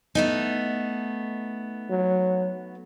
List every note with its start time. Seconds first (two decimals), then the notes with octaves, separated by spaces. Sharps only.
0.15 A3 B3 D#4
1.90 F#3